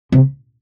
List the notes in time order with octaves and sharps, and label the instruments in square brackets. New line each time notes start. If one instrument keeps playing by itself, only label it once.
[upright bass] C3